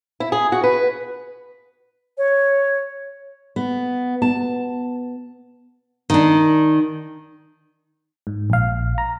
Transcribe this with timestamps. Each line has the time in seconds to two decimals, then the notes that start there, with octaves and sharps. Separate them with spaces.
0.20 E4
0.32 G#4
0.52 F#4
0.64 B4
2.18 C#5
3.56 B3
4.22 B3 A5
6.10 D#3 D4
8.27 G#2
8.50 A#1 F5
8.98 A#5